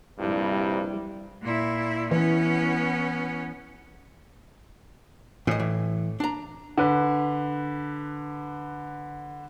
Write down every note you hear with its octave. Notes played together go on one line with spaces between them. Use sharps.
A#1 G2 C3 G3 E4
A#2 E4
E3 B3 C#4
A2 E3 D#5
E3
D4 A#5
D3 B4